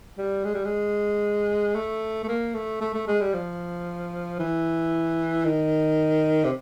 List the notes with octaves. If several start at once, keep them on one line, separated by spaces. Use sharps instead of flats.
G3
G#3
G3
G#3
A3
A3
A#3
A3
A3
A3
G#3
G3
F3
E3
D#3
C3